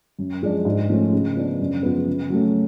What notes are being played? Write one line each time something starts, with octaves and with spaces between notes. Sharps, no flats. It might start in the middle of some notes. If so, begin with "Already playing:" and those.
F#2
F3 G#3 D4
G#2
F3 A3 C#4
C#3
F3 B3 D4
F#2
F3 G#3 B3
C#3
F#3 A3 C#4